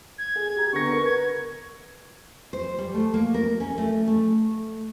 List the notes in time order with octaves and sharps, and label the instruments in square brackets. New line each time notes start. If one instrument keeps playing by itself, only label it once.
[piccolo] G#6
[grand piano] G#4
G4 A#5
[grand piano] D3 B3 A#6 [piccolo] C#6
[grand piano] A#4 B4
[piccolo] G#6
[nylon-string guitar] C5
G3
A3
A#3
A#4
C#4
A3
A3